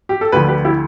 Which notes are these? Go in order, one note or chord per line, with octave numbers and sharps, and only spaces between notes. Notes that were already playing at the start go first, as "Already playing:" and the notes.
G4
A4
D2 D3 F3 G4 B4
G4 B4
E4 G4